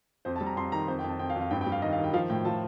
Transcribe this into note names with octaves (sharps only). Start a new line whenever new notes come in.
F2 C5
A5
G3
A#5
F2 C6
D#3 A#5
F2 C5
G5
F2
A5
F2 G5
F5
F2
F5
G2 G5
G5
G3
F5
D#3 D#5
F5
D#3
G5
F3 F5
A2 G5
F3 A5